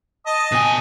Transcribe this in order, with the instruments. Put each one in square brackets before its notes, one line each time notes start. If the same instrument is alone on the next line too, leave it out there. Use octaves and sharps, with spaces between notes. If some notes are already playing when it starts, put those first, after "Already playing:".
[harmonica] D#5 A5 D#6
[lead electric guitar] B2 G#5